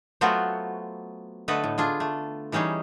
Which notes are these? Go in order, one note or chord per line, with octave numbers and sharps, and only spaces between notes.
F#3 A3 B3 C4 F4 F#4
D3 A3 A4 B4 D#5
A2
D4 F4 G#4
A3
E3 G3 C#4 D#4 G#4